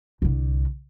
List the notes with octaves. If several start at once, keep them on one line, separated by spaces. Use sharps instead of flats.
C2 D3